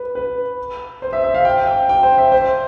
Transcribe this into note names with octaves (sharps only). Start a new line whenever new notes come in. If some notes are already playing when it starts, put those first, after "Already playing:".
Already playing: B4
B4
C5
E5
E5
F5
G5
G5
G5
C5
E5
C5